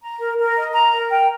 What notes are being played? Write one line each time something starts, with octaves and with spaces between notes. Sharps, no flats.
A#5
A#4
A#4
D#5
A#5
A#4
G5